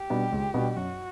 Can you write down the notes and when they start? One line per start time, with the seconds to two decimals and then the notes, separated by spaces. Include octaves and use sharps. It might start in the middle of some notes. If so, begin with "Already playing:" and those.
Already playing: G4
0.10 B2 G3 B3 D4
0.32 C#2
0.54 B2 G3 B3 D4
0.76 F#2 F#4